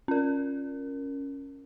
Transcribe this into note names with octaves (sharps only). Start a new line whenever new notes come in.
C#4 A#4